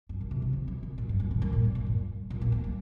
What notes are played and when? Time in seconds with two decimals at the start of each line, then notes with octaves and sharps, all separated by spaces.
0.09 G2
0.21 A#2
0.31 C3
0.42 C3
0.53 D#3
0.68 C3
0.83 A#2
0.98 G2
1.09 G2
1.20 A#2
1.31 D#3
1.42 A#2
1.53 G2
1.64 A#2
1.75 A#2
1.86 G2
2.30 A#2
2.41 A#3
2.52 A#3
2.64 G3